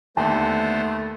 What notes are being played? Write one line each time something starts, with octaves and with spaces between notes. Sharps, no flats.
D#2 D3 A3 B3 C5 A5